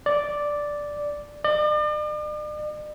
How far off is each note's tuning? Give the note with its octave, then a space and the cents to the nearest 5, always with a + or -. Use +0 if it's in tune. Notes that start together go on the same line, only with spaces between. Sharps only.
D5 +0
D5 +45